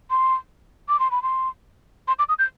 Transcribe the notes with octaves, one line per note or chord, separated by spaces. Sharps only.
C6
D6
C6
B5
C6
C6
D6
D#6
G6